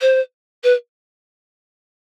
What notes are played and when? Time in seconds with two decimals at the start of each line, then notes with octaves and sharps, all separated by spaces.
0.01 C5
0.63 B4